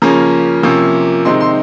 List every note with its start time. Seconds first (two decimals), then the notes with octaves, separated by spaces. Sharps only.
0.02 C#3 F3 A#3 C#4 A#5
0.63 C3 F3 A#3 C#4
1.25 C3 D#3 G#3 C4 D#4 C6
1.40 C6